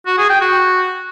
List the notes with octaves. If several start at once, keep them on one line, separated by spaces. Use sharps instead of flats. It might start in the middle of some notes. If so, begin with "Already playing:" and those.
F#4
G#4
G5
F#4